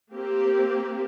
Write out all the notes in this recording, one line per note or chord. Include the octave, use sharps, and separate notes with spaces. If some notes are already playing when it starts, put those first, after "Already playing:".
A#3 C4 G4